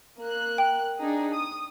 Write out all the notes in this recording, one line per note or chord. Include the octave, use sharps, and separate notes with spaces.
A#3 F#6
G5
D4 D#4 G#4
D#6